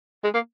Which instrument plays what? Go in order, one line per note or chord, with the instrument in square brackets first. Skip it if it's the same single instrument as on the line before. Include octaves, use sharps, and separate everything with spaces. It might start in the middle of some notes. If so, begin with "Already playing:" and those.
[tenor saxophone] G#3
A#3